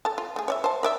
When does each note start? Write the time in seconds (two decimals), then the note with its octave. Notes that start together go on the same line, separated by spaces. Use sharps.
0.05 A4 A5
0.18 F4
0.36 A3 G#4
0.48 C#5 D5 E5
0.64 C5 A5
0.83 A#4 D5 E5